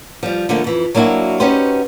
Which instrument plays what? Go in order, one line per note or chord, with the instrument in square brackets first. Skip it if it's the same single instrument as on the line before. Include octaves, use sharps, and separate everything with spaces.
[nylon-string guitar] F3 G3
D3 F3 A3 A#3
F2 E3
F#3 A#3 D4 E4 F#4
C#4 D#4 F#4 G4 B4 C5